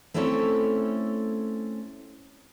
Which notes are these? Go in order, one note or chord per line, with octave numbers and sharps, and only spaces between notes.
A3 C4 C#4 E4 A4 C#5